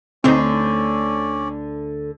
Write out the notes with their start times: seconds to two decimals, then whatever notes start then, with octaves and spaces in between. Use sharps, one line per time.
0.24 D2 D3 C4 C#4 D#4 C5 D5